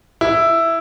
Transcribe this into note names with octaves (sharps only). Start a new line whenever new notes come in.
E4